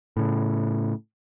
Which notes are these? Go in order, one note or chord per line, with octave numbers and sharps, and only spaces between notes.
A2 C#3